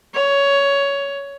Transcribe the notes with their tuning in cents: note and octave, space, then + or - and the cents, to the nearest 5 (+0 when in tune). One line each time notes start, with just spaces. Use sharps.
C#5 +15